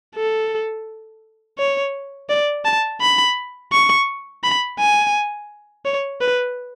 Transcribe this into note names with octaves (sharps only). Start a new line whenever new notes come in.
A4
C#5
D5
A5
B5
C#6
B5
G#5
C#5
B4